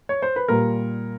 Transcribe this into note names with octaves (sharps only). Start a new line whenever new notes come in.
C#5
C5
B4
A#2 G3 A#4